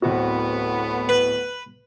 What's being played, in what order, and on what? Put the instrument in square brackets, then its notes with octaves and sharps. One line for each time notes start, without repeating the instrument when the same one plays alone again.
[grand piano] D1 C4 F#4 [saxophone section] A2 B3
[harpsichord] B4